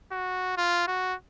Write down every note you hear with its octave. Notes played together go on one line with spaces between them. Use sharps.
F#4
F4
F#4